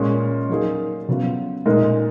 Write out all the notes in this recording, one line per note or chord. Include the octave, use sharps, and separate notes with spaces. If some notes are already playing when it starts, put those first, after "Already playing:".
Already playing: A#2 G#3 C#4 G#4
F#3 A#3 D#4 G#4
C#3 F#3 B3 F4
A#2 G#3 D#4 A#4